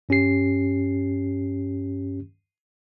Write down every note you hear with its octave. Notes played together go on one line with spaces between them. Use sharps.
G2 C#4 G4 C7